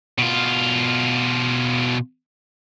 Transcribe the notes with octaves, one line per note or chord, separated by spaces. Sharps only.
B2 F4